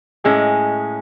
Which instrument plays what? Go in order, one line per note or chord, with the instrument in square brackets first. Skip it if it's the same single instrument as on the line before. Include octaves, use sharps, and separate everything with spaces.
[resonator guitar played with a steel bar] A2 G#3 C#4 [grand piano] G#4